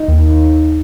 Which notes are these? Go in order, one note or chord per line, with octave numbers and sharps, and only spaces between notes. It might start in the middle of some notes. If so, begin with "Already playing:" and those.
Already playing: D#4
D#2